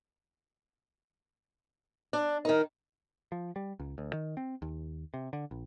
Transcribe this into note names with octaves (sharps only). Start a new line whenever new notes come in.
D4
D#3 D#4 A#4
F3
G3
C#2
D2
D#3
C4
D#2
C3
D3
A#1